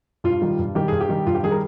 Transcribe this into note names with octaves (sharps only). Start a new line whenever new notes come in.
G2 F4
D#3 G3
G2
D#3 G3 G4
G2 G#4
G4
D#3 G3
G2 F4
G4
D#3 G3 G#4
A#4